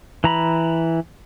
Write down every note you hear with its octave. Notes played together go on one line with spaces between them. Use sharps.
E3 A#5 B5